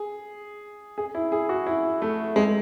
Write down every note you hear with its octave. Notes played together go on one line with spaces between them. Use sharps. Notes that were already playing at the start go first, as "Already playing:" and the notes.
Already playing: G#4
G#4
E4
G#4
F#4
E4
A3
G#3